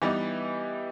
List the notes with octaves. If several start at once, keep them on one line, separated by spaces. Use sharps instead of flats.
E3 G3 B3 D#4